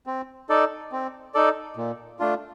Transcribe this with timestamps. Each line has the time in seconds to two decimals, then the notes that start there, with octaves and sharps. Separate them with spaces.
0.07 C4
0.49 D#4 A4 D5
0.92 C4
1.34 D#4 A4 D5
1.77 A#2
2.19 A3 D4 F4